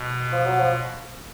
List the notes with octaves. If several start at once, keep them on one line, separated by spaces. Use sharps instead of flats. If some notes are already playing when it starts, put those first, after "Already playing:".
Already playing: B2
F3
F#3
F3